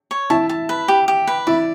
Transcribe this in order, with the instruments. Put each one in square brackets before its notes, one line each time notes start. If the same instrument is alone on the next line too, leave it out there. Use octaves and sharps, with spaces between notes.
[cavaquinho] C#5
[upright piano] E4 E5 [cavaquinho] A5
[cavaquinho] A5
B4
G4
G4
B4
[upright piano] E4 E5 [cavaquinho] D5